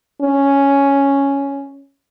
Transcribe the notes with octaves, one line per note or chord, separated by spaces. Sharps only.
C#4